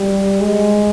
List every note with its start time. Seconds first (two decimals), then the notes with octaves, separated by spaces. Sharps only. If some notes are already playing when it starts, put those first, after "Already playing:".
Already playing: G3
0.41 G#3